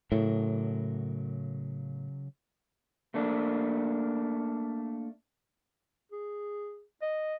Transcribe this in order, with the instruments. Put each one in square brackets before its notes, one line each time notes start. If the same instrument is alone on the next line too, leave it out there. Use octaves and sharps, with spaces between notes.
[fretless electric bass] A2 [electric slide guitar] C#3 F#3 A#4
[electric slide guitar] A3 A#3 D4
[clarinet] G#4
D#5